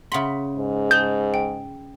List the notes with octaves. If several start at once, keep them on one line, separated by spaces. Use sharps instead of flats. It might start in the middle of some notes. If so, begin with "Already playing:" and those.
C#3 E5 F#5 B5 C6
G#2
G#4 A5 D#6 G6
G5